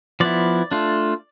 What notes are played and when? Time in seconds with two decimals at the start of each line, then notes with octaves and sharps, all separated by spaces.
0.20 F3 B3 E4 D5
0.71 A3 D4 F4